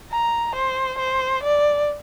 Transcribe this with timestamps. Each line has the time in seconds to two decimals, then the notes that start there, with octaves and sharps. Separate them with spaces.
0.11 A#5
0.55 C5
0.98 C5
1.43 D5